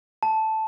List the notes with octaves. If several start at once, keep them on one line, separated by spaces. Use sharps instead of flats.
A5